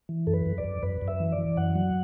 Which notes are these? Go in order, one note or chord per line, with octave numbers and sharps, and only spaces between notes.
E3
F#2 A4
B4
F#2
D5
F#2
F#2 B4
F#2
E5
E3
D5
E3
F#2 F#5
F#3